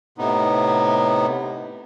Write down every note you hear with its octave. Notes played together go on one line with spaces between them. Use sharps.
A2 C3 B3 D#4